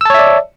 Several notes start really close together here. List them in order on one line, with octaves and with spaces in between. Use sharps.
E6 A5 C#5 E5 D5